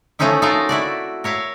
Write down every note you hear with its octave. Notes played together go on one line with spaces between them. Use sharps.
F3 A3 C4 C#4 D#4 E4
D#4 F4 F#4 A4 A#4
A3 E4 F#4 D5
A#4 C#5 E5 F5